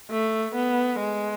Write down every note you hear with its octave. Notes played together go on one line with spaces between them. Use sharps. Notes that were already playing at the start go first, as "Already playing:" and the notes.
A3
B3
G#3